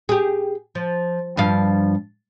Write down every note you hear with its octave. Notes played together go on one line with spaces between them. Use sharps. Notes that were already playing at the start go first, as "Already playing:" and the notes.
G4 G#4
F3
G2 F3 F5